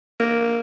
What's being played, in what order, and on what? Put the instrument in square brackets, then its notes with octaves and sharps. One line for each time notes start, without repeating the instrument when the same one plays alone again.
[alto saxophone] A#3